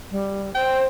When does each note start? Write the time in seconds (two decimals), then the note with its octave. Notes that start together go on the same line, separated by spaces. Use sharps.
0.11 G3
0.55 C5 G5